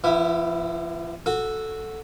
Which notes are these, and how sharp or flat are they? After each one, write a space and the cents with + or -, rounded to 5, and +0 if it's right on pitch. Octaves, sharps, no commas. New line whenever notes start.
F3 -40 B3 +0 E4 +0
F#4 -10 A4 +0